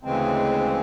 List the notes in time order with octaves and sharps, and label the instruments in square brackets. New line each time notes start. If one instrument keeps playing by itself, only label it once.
[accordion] D2 C#3 E3 G#3 C4